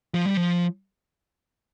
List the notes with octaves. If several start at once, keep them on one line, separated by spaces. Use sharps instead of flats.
F3
G3
F3